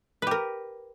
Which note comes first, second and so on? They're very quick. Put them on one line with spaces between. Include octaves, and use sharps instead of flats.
B4 G4 A#4